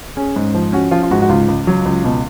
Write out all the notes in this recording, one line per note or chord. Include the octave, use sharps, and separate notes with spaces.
C#4 G#4
G#2
F3
C#4 F#4
F3 F4
F4
G#2 F#4
F#4
C#2 F4
C#2
F#3
C#2
B2